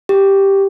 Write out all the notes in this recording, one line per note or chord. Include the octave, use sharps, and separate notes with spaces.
G4